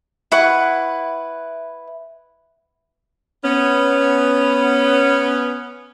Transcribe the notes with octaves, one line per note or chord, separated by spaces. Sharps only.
E4 B4 F#5 C#6
B3 C#4